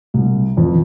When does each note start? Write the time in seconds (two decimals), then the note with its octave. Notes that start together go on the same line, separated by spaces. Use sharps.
0.14 C2
0.57 F2 E3